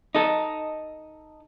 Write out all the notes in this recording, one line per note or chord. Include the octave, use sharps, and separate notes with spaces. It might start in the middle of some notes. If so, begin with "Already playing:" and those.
D#4 A4